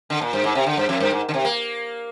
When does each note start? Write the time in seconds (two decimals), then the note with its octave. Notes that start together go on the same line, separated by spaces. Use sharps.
0.10 D3
0.21 A#2
0.33 G2
0.44 G#2
0.55 C3
0.66 D3
0.77 G2
0.89 F2
1.00 G2
1.11 G#2
1.29 D3
1.34 C3
1.45 A#3